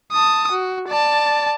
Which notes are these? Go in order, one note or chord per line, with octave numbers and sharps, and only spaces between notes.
A5 D#6
F#4
D5 A5